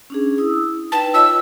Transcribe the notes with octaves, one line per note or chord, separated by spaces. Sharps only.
C#4 D4 G#4
E4 D#6 E6
D#4 B4 G5 A5
F4 C#5 D#5 E6